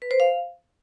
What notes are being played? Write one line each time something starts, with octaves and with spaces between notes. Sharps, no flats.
B4
C5
F5